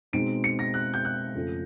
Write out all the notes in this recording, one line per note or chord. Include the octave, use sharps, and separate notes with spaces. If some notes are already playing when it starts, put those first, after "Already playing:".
B2 G#3 C4 D#4 D7
C#7
A#6
F#6
G6
F#6
F2 C#3 F3 A3 C#4